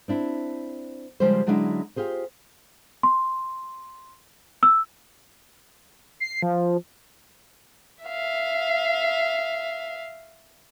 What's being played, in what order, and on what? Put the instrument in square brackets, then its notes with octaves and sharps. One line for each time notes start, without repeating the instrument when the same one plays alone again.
[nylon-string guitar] C4 D4 E4
C#3 F3 G3 G#3 G4 C5
D3 F#3 G#3 C#4 D4 E4
F4 G4 G#4 C5
[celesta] C6
E6
[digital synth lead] C7
F3
[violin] E5 F5